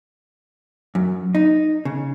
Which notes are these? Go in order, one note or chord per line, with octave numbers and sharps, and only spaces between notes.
F#2
D#4
C#3